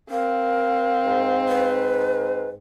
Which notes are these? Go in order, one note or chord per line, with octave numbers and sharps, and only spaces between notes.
C4 A#4 F5
G#2
B4